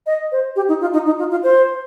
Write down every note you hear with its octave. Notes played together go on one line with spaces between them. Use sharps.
D#5
C5
G4
D#4
F4
D#4
D#4
F4
F4
C5